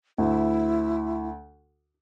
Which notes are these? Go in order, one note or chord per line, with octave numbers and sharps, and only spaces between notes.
D2 E4